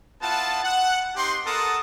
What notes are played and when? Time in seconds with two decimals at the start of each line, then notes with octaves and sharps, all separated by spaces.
0.21 B3 E4 F4 F#5 A5
0.64 F#5
1.16 C4 D#4 G4 F#5 C6
1.45 B3 A4 A#4 F#5 A5 D#6